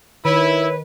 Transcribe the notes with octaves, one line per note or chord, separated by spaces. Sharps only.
D#3 E4 B4 C#5